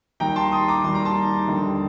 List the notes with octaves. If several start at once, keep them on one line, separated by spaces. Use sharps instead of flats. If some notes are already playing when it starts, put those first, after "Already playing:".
D#2 D#3 G3 G5 A#5
A5 C6
C6 D#6
A#5 D6
D#2 D#3 G3 C6
A#5
A5 C6
D#2 D3 G3